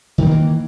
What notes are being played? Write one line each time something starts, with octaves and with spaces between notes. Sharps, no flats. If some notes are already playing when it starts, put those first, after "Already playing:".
D#3 E3 G3 A#3